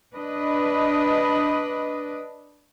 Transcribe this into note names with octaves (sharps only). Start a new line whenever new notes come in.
D4 B4 D#5